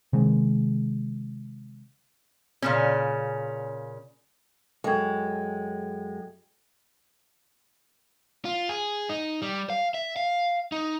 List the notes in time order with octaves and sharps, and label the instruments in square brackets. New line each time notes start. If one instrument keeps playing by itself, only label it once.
[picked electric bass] C3 D#3 G#3
[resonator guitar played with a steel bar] A#2 C#3 C#4
[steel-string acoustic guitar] F#2 G#3 [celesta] A4 G5 G#6
[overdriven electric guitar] F4
G#4
D#4
G3
F5
E5
F5
D#4